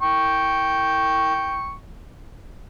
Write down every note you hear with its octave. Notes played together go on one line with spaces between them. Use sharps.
G5 C#6